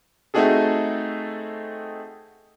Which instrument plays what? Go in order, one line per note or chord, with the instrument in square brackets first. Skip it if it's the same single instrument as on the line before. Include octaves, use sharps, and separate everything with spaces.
[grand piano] A3 C4 D#4 F#4 G#4 A4